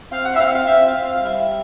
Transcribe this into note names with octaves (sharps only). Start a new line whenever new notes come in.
C4 F5
F#5
E5
C4 F5
F5
C4 E5
F5
C4
F5
G3 E5